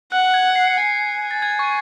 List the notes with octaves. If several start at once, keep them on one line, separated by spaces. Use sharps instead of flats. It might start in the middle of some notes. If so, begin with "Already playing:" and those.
F#5 F#6
G#6
C7
C#7
G#5 C7
A6
G#6
C#6